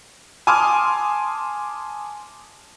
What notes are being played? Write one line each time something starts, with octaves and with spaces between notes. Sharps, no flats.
G#5 A5 C6 D6 D#6 F6